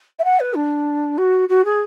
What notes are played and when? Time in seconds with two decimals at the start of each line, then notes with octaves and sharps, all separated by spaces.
0.19 E5
0.24 F#5
0.40 B4
0.55 D4
1.18 F#4
1.49 F#4
1.65 G#4